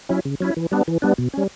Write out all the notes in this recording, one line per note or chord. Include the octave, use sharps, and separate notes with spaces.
F#3 C#4 E4
C#3
F#3 C#4 E4
E3
G3 B3 D4
E3
G3 B3 D4
B2
G3 C#4